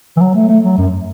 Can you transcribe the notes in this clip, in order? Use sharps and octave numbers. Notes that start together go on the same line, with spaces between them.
E3
F#3
A3
A3
F#3
F#2